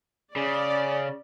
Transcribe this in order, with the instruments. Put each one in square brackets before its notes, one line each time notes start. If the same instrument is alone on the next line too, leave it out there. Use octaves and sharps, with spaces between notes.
[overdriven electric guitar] C#3 [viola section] D5